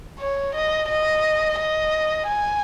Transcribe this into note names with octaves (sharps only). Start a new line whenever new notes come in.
C#5
D#5
D#5
D#5
G#5